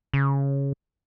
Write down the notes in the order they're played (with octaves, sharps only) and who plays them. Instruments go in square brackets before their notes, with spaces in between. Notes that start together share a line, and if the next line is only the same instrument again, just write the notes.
[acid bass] C#3